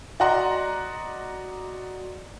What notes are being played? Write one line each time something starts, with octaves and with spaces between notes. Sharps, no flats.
F#4 D5 D#5 F#5 A#5 C6